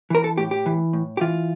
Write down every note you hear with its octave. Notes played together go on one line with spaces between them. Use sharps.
E3 A#4
A4
A2 G4
G4
E3
A2
G4
E3 F4